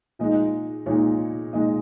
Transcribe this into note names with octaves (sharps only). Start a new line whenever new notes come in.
A#2 G#3 D#4 D#5
A#2 G#3 D#4 C#5
A#2 G#3 D#4 D#5